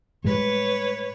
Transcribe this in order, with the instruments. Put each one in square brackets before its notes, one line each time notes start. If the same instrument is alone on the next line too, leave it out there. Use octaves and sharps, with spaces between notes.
[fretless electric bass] A2 G3 G#3 [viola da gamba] B4 C#5